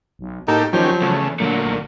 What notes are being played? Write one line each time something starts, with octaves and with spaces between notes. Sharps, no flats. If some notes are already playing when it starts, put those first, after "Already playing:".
B1
A2 A#3 D#4 G4 A4
D#2 F3 F#3 C#4 G4
E2 C#3 A3
A#2 D3 F#3 A3 A#3
B1